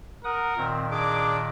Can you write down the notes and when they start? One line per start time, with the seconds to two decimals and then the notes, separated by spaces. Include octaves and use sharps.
0.24 A#4 F#5 D#6
0.57 A#2 D#3 C4
0.90 D4 G#4 D6